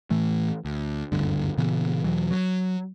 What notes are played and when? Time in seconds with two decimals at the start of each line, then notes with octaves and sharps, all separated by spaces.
0.10 A2 E3 A3
0.65 D2
1.12 F#1 D2 G2 D3
1.58 A#2 C#3 E3 B3
2.04 E2 B2 E3 F#3
2.31 F#3